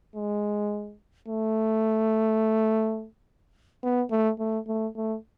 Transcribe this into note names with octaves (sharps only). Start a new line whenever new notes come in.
G#3
A3
B3
A3
A3
A3
A3